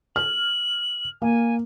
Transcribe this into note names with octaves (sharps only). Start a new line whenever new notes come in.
F6 F#7
A#3 G#5